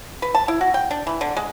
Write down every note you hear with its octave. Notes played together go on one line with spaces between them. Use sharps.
B4
A5
E4
F#4
G5
D4
E3
D3
G#3